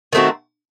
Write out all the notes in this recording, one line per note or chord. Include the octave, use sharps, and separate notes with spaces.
D#3 A3 C4 F#4